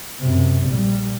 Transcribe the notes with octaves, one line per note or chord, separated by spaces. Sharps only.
F#2 C3
A#1 G3